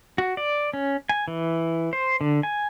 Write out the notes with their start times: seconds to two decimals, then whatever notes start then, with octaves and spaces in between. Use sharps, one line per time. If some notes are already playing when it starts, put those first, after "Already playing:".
0.18 F#4
0.37 D5
0.73 C#4
1.09 G#5
1.28 E3
1.93 C5
2.21 D3
2.43 G#5